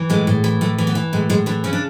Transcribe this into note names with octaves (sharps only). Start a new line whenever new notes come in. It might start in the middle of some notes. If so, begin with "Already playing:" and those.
Already playing: E3
A2 G#3
A2
E3
A2 A3
E3
B3
E3
A2 G#3
A2 G#3
E3 D4
C#3 C#4
D4